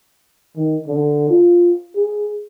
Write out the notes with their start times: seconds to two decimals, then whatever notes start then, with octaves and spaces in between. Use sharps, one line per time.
0.57 D#3
0.87 D3
1.30 F4
1.96 G#4